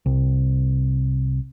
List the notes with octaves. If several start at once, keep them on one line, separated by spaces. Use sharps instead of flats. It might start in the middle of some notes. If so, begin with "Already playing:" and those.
C2